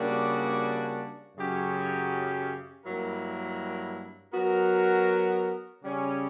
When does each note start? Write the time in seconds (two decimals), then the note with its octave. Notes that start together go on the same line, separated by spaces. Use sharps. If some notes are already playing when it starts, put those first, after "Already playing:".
Already playing: C#3 G3 A#3 D4 F#4
1.37 F#2 C#3 F#3 C#4 G4
2.86 G2 F#3 A#3 E4 A#4
4.34 F#3 B3 F#4 A#4
5.83 C#3 G3 C#4